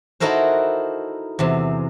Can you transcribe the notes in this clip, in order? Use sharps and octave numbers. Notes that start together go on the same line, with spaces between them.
D#4 E4 F#4 A4 A#4 C5
E2 C3